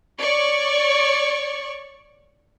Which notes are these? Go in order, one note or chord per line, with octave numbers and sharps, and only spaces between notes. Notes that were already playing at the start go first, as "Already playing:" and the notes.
C#5 D5 C#6